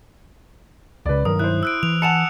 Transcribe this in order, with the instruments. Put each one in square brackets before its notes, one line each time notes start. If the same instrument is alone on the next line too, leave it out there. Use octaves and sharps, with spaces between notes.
[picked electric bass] C#2 C#3 [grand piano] B4 D5
[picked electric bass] G2 D#3 F#3 [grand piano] A#4 [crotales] D#6
[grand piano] E4 C5 [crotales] F#6
[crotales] E6 F#6 D7
[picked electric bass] E3 [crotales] F7
[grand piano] F#5 G#5 A5 [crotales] C#7 E7 F7